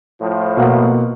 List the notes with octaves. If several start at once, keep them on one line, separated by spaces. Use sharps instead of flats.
A2 F3
B2 A#3 F#5